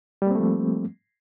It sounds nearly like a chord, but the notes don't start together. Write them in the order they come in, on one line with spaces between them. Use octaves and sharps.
G3 A#3 C4 A3 F3